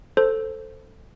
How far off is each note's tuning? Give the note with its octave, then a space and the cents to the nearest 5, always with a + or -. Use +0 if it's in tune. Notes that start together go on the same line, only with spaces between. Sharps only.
A4 +10 C5 +0